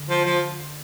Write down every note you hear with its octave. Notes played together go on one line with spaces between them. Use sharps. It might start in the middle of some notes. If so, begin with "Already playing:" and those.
Already playing: D3
F3
F3